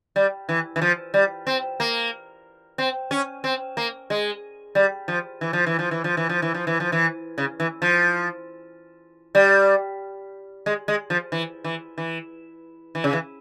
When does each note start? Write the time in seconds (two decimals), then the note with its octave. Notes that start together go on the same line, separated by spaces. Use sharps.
0.16 G3
0.49 E3
0.76 E3
0.82 F3
1.14 G3
1.47 C4
1.80 A#3
2.78 C4
3.11 C#4
3.44 C4
3.77 A#3
4.10 G#3
4.75 G3
5.08 F3
5.41 E3
5.53 F3
5.66 E3
5.79 F3
5.91 E3
6.04 F3
6.17 E3
6.29 F3
6.42 E3
6.54 F3
6.67 E3
6.80 F3
6.92 E3
7.38 C#3
7.60 E3
7.82 F3
9.35 G3
10.66 G#3
10.88 G#3
11.10 F3
11.32 E3
11.64 E3
11.98 E3
12.95 E3
13.04 C#3
13.13 E3